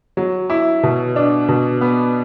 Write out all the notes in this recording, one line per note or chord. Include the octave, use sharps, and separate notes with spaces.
F#3
E4
B2
D4
B2
B3